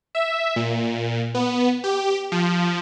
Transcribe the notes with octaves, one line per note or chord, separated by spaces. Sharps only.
E5
A#2
B3
G4
F3